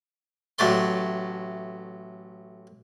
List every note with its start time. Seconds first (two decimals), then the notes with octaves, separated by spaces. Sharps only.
0.58 A1 F#3 A3 D5 C6